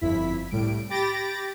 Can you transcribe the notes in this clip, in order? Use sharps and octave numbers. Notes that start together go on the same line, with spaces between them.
G1 F2 E4 B6
C2 A2 G3 D7
G4 B5 A6 A#6 D7